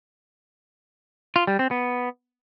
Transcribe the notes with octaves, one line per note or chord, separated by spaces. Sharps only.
F4
G3
C4
B3